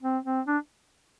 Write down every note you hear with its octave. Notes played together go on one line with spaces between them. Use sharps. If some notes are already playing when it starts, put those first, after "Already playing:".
C4
C4
D4